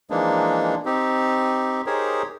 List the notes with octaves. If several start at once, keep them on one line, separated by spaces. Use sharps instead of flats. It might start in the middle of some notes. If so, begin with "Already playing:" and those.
E3 F3 G#3 A#3 D4 D#4
C4 D#4 G4
D#4 G4 G#4 A#4 C5 C#5